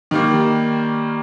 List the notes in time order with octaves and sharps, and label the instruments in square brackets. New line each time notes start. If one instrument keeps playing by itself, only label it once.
[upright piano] D#3 G3 A#3